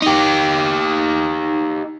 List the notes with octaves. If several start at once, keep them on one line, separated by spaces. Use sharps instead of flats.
D#4 G4